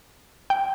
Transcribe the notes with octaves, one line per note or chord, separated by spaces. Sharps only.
G5